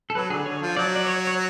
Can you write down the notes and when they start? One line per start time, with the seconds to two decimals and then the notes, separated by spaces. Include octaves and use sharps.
0.10 A4
0.15 F#3 B4
0.30 D3 G#4
0.46 D3 C#5
0.61 F3
0.77 F#3 D5
0.96 D5
1.07 C#5
1.27 C#5